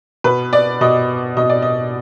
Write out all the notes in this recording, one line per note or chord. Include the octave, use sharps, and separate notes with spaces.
B2 B4
D5
B2 D#5
B2 D#5
D5
D#5